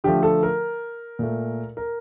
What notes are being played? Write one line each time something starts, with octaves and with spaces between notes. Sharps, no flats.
D3 F3 A3 G4
A4
A#4
A#2 A3
A#4